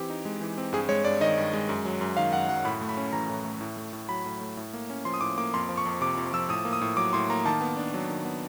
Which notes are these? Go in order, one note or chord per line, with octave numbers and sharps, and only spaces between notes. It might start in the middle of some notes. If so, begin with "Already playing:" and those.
Already playing: E3 C4 G4
D#4
G#3
E3
C4
G2 G#4
G#3 C#5
G2 D5
D#3 D#5
G2
G#3
F#2
F#3
F#2
D#3 F5
F#2 F#5
F#3 F#5
A2 B5
A3
B5
C#4
E3 A#5
A2
A3
A2
A3
A2
F#3 B5
A2
A3
A2
A#3
C#4
F3 C6
D#6
A2 D6
A#3 D6
F2 C6
F3
C#6
F2
C3 D6
F2
F3 E6
A2 D#6
A#3
D#6
A2
F#3 D6
A2 C6
A#3 A#5
D#3 A5
B3
D4
F#3
D#3
B3